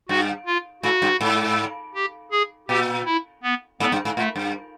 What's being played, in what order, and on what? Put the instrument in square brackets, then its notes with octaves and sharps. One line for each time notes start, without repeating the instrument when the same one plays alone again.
[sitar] G2 [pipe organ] F#4
[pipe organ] F4
[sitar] G#2 [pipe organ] F#4
[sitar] G2
G#2
[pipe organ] G4
G#4
[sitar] A#2 [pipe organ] G4
[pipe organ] E4
B3
[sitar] G#2 [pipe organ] B3
[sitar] G2
G#2
[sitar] A2 [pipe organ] A3
[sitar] G2